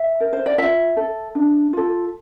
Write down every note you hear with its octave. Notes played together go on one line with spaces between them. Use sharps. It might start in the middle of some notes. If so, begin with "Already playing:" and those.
Already playing: E5
A#4
C5
D5
F4 E5
A4
D4
F4 A4